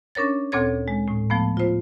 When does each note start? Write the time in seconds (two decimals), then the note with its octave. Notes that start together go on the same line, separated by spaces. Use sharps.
0.15 C#4 D4 A#4 C#5 A6
0.52 D2 A#2 C4 A4 C#5 G#6
0.88 G#3
1.08 A2
1.30 F3 A3 B3
1.57 F4 C5